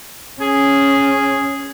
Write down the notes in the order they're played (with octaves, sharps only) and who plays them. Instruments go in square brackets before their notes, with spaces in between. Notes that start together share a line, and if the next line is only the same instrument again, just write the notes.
[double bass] C#4 [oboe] G#4